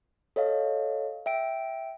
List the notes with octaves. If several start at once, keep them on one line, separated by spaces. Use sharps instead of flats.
A4 C#5 D#5 F5
E5 G5 D7